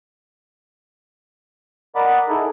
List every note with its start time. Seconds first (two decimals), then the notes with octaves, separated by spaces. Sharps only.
1.96 A#4 D5 D#5 F#5 B5 D6
2.29 D#4 E4 G#4 A4